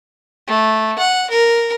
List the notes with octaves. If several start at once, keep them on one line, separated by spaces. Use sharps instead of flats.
A3
F#5
A#4